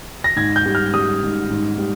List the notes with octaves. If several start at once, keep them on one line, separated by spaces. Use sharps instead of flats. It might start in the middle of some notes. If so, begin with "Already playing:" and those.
A#6
G#2 G#6
G6
G3
F6
G3 D#6
G#2
G#2
G3